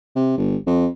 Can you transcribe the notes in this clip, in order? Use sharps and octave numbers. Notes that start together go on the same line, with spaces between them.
C3
G1
F2